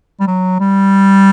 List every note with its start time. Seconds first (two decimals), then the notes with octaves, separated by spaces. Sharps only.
0.20 G3
0.27 F#3
0.60 G3